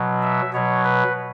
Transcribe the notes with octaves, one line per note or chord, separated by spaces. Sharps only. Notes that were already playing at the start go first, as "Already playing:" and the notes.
Already playing: B2 F#3
E5
B2 F#3 C#5
B4